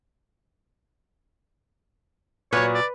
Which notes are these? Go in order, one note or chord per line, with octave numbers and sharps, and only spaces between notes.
A#2 F#3 B4 C#5
D5